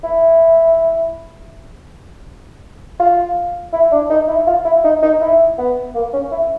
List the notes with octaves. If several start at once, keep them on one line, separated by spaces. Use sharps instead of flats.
E4
F4
E4
D4
D#4
E4
F4
E4
D#4
D#4
E4
B3
A#3
C#4
E4